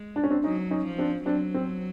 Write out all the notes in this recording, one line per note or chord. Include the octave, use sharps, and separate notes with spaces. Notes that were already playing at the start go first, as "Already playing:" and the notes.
Already playing: G#3
D4
C#4
C4 D4
F#3 C#4 D#4
C#4 D#4
F3
C4 D4
F#3 C4 D4
C4